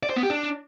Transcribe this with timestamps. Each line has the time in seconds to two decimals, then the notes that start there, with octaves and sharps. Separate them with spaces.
0.03 D5
0.10 C5
0.16 B3
0.23 G4
0.30 D4